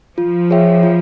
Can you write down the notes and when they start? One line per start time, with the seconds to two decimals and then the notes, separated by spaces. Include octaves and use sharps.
0.18 F3 F4
0.50 G#4 C#5 E5 G5
0.83 F4